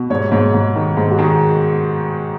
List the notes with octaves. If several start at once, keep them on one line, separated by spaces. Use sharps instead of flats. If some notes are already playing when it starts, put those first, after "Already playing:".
Already playing: B2
G#2 C#5
G#2
G#2
D#3
G#2
F#4
D#3 G#4